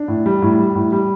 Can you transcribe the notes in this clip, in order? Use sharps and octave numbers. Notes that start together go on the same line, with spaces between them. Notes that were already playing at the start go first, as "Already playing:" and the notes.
Already playing: D4
A2
G3
A2
G3
A2
G3